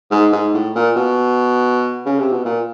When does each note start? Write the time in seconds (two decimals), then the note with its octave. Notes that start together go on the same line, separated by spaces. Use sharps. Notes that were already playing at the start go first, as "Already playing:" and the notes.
0.11 G#2
0.32 G#2
0.54 A2
0.75 A#2
0.96 B2
2.06 C#3
2.19 C3
2.32 B2
2.45 A#2